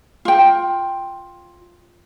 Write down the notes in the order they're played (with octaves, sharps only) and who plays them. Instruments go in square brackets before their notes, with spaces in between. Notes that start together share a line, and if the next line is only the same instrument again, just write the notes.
[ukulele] F4 G5